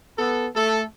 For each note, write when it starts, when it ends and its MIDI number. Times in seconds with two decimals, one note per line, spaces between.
0.18 0.46 59
0.18 0.46 69
0.55 0.83 57
0.55 0.83 69